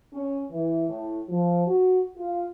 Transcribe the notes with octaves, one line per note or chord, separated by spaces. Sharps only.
C#4
E3
A2
F3
F#4
F4